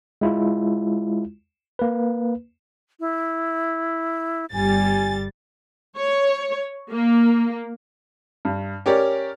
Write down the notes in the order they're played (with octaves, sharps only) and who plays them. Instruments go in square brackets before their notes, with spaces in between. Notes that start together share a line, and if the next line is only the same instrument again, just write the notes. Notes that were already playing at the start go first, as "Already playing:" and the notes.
[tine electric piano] G#3 E4 F4
A#3 B4
[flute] E4
[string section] G1 G3 A6 [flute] G#5
[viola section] C#5
A#3
[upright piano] G2
C#4 G4 A#4 C#5 D5